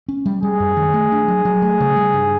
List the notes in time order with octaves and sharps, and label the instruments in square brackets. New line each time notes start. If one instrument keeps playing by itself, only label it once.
[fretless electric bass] C#4
G3
[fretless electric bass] G3 [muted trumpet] G#4
[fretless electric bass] F#2
D#3
A3
D4
F#3
F#3
A3
C#3
G3
G2